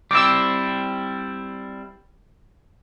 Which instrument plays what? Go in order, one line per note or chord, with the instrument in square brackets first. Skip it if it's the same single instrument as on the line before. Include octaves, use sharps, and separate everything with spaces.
[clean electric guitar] G3 C4 E4 [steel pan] D6 E6